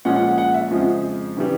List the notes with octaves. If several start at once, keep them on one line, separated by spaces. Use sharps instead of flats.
A#2 F3 G#3 C#4 F#5
F#5
F#5
F#5
E5
F2 C#3 F3 G#3
C#3 E3 G3